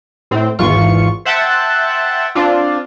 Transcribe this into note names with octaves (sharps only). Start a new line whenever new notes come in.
A2 C4
G#1 E2 F4 C#6
C5 E5 F#5 G5 A5
C4 D4 F4